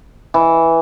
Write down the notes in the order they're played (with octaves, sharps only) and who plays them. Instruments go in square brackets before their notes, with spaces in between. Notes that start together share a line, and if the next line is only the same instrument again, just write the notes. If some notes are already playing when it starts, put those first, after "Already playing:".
[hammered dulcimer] E3